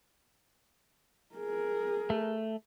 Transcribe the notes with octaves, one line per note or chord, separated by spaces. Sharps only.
G#4 A#4
A3